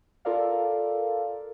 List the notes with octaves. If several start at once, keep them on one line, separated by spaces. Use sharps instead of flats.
F4 A4 A#4 D5 F5